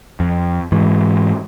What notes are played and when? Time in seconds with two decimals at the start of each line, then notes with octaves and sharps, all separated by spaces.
0.20 F2
0.72 G#2 E3